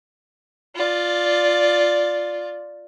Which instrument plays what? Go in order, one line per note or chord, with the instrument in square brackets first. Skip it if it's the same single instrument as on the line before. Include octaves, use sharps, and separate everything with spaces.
[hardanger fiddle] F4 D5